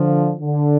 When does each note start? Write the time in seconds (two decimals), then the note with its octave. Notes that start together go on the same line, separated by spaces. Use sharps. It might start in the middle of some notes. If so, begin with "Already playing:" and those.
Already playing: D3 F3
0.40 D3